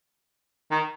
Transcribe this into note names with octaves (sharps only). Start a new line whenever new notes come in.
D#3